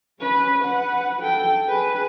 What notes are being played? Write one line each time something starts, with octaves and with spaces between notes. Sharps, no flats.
C#4 B4
B4 F#5
A4 G5
G#4 B4